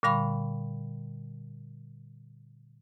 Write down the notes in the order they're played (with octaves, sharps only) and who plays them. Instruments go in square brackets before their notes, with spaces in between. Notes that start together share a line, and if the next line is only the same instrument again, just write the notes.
[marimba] A#2 D3 G3 F5 B5 C#6